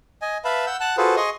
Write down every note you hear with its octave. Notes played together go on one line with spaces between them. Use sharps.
D#5 G#5
B4 E5 F5 A5 B5
F#5 E6 G6
F#5 A5 F#6
F4 F#4 G#4 A4 B4 C5
G#4 D#5 C6 C#6 D#6